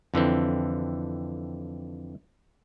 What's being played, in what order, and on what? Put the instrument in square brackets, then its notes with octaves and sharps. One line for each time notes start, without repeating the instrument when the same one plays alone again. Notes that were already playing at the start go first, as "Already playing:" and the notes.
[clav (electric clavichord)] F2 D3 E3 C4